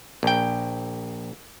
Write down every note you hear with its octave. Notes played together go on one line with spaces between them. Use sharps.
A#1 G5